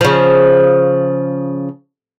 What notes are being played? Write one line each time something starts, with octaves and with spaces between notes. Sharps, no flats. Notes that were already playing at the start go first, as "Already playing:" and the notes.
C#3 F3